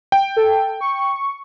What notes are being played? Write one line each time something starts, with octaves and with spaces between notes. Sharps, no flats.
G5
A4
C#6